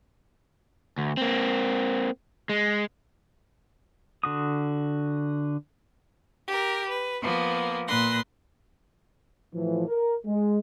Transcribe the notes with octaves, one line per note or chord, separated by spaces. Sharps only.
D2
A#3 C4
G#3
D3 F#4 D#6
G4 A#4
B4
F3 A#3 B3
A#2 B4 C6 A#6
A2 E3 F3
A#4
G#3